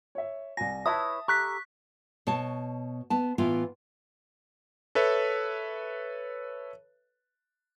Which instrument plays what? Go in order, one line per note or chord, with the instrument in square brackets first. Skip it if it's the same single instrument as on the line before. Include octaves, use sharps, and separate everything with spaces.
[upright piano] C#5 E5
[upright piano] C2 G#5 [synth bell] A#6
[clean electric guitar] E4 B4 C#5 [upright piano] E5 A5 [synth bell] D#6
[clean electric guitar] G4 A4 A#5 [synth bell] C#6 F#6 B6
[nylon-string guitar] B2 C#5 A5
B3 A5
A2 E3 B3 F4
[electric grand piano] A4 B4 C#5 E5